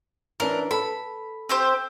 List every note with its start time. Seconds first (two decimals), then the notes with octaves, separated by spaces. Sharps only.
0.40 E3 C#4 D4 A#4
0.71 A4 B5
1.49 C4 G4 C5